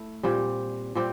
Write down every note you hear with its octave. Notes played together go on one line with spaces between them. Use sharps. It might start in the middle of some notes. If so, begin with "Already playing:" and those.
Already playing: A3 E4
A#2 G3 C4 G4
A#2 G3 C4 G4